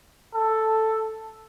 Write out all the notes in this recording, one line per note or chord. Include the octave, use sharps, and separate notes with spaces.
A4